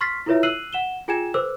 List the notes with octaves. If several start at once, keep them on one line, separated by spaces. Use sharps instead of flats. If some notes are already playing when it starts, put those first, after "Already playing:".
C6 C#6 F6 A6 B6 C7
E4 F4 A4 B4 C#5 E5
E6 F#6 C7 D#7 F#7
F#5 E7 G7
F4 G#4 G5 G#5 G#6 E7
A4 B4 C5 D6 E6